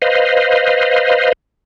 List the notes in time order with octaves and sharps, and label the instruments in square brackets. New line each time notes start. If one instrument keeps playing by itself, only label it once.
[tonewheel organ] B4 C5 D#5 F5